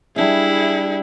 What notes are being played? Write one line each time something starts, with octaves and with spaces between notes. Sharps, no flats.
G3 D4 E4 G#4 E5